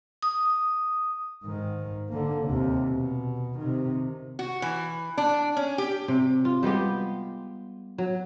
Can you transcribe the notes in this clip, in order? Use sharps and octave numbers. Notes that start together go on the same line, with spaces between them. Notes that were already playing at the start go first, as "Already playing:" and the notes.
D#6
G#2 D#3
D3 A#3
D#2 C3
B2
C3 D#3
F#4
E3
D4
C#4
G4
C3
F4
G3 G#3 B3 G4
F#3